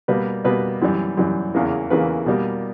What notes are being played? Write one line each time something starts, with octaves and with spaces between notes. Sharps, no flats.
B2 G3 A#3 B4
B2 G3 A#3 B4
F#2 E3 G3
F#2 E3 G3
E2 C#3 E3 A#3
E2 C#3 E3 A#3 B4
B2 G3 A#3